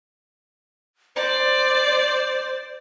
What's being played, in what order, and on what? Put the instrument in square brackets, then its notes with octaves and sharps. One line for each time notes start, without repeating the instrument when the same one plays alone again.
[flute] C5 [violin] D5